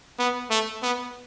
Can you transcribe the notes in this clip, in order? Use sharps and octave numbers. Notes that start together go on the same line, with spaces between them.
B3
A3
B3